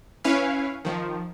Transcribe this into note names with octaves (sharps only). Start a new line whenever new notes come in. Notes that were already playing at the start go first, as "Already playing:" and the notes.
C#4 E4 B4 C#5 F5
D#3 F3